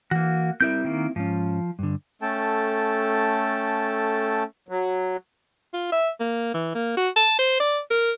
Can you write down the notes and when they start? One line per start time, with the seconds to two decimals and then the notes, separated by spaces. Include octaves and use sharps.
0.11 E3 A#3 F#4
0.61 G3 C4 E4 A#4 E5 G6
0.85 D#3 A#3
1.16 G#2 F3 C#4
1.79 G2 D3
2.22 A3 C#4 A4 G5 A5
4.69 F#3
5.74 F4
5.92 E5
6.20 A#3
6.54 E3
6.75 A#3
6.97 F#4
7.16 A5
7.39 C5
7.60 D5
7.91 A#4